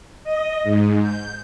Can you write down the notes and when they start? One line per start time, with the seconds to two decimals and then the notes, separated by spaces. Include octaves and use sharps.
0.24 D#5
0.63 G#2
1.01 G6